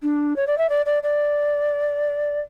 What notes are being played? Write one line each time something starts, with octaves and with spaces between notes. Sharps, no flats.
D4
C#5
D5
E5
D5
D5
D5